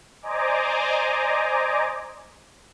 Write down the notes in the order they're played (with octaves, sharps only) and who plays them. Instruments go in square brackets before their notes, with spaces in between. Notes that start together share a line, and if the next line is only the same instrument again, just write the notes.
[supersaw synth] C5 D5 D#5 G#5 A#5 D6